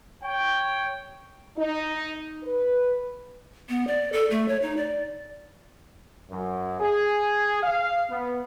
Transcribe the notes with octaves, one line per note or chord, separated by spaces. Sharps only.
C#5 G5
D#4
B4
B3
D5
A4
A3
C#5
D#4
D5
F#2
G#4
F5
B3